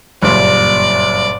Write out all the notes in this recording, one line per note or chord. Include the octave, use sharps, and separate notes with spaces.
F#1 G2 A#2 D5